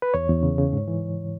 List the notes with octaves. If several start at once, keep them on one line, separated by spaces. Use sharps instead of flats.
B4
E2 C#5
E2
C#3
C#3
G#2
E3